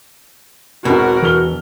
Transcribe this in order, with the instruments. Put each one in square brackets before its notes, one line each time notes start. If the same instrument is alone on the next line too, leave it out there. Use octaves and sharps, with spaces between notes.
[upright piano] G#1 E2 [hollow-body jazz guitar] B2 [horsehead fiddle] F#4 A#4
[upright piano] E1 F6 G7 [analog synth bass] E3